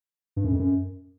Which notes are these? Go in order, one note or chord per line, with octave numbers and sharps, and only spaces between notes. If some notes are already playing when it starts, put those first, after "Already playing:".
G2
F#2
F2
F#2